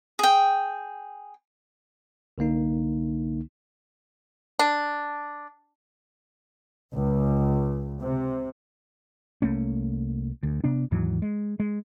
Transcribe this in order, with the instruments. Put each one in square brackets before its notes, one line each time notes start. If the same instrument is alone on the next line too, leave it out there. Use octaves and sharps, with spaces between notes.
[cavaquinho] G#4 G5
[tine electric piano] C2 D3 A#3 D#4
[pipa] D4
[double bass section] C#2
C3
[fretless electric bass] C2 A3 A#3 C#4
D2
C3 B3 D4
D#2 G#2 E3 F#3
G#3
G#3